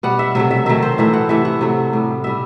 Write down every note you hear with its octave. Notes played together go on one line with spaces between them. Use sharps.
B2 G3 F#5
E5
C3 F#3 A3 E5
E5
D#3 F#3 A3 E5
C5
A2 E3 A3 E5
F#5
C3 E3 A3 E5
F#5
C3 F#3 A3
A2 G3
B2 G3 E5